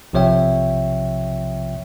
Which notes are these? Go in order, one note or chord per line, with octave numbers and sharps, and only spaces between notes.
B1 C3 F3 C#5 E5 G5